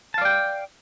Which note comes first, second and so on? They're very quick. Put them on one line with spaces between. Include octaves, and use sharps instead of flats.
A5 F5 D5 G5